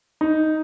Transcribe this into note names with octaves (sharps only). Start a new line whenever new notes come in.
D#4